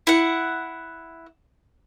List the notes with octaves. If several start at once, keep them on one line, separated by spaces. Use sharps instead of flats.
E4 F#5